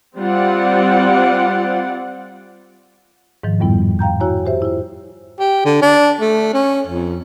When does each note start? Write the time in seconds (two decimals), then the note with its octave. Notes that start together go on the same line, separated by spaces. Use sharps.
0.17 G3 C4 F4 D5 F#5
3.43 G#2 D#3 F3
3.60 F2 A2 G3 B3 E4
3.99 F5 G5 A#5 G6
4.20 E4 F#4 C#5 G#5 A#5
4.46 G4 C5 E5
4.62 E4 F4
5.39 G4
5.65 D3
5.82 D4
6.21 A3
6.54 C#4
6.87 F2